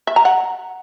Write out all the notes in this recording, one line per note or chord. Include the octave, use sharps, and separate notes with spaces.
E5
A#5
F#5